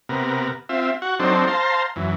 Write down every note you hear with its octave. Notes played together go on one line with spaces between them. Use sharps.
C3 B3 A#4
C4 F4 E5
F#4 F#5 C#6
F#3 C4 D4 D#4 A4 C5
C5 F5 A5 A#5 C6
F#2 E3